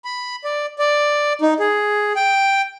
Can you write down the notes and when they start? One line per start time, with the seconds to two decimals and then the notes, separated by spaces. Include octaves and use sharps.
0.05 B5
0.44 D5
0.79 D5
1.42 D#4
1.60 G#4
2.16 G5